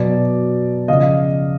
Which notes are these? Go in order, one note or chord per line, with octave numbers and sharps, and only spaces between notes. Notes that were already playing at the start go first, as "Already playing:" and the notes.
Already playing: B2 F#3 D5
C#3 F3 D#5 F5